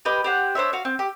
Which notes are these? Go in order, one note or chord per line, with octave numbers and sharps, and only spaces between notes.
G4 B4 D#5
G4 C5 F#5
D4 C5 C#5 E5
F#4 F5
C4
G4